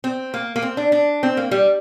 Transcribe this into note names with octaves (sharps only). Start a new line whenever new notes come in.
C4
A#3
A#3
C4
D4
D4
C4
A#3
G3